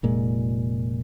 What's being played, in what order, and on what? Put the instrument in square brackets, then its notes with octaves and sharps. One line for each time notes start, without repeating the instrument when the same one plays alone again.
[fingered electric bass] F1 A#2 G#3